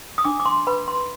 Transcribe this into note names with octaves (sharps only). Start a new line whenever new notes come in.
D#6
D4 D6
D6
C6
B4 B5
C6